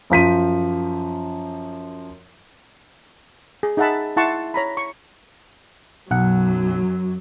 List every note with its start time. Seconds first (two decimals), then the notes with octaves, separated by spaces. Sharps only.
0.10 F#2 F3 B6 D#7
3.63 G#4
3.77 D#4 G#4 E5 F#5 A5 B5
4.17 E4 F#5 A5 C6 C#6
4.54 C#5 A#5 B5
4.77 C#6
6.11 B1 F#2 F#3 F#5